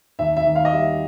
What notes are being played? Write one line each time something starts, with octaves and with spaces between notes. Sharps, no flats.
D#2 E5
E5
D#3
F5
D#5
G3 E5